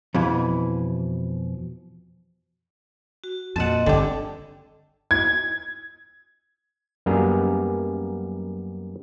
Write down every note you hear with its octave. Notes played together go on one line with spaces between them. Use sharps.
F2 B2 E3
F#4
F2 A#2 C4 D#5 F#5 A5
G1 D3 G4
G#6
F#2 G3 A#3 B3 G#4 A#5